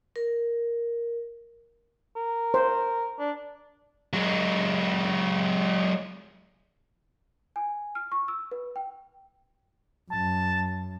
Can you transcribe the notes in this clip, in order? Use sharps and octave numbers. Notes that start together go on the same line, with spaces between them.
A#4
A#4
C5
D4
F#3 G#3
G#5
F6
C#6
E6
B4
G5
F#2 A5